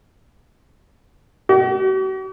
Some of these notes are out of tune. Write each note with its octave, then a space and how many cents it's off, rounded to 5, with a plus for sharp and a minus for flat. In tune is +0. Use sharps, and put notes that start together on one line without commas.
F#4 +45